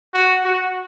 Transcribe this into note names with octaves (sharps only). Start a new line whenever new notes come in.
F#4
F#4